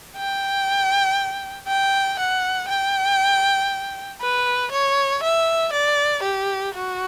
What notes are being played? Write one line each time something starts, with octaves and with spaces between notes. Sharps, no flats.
G5
G5
F#5
G5
B4
C#5
E5
D5
G4
F#4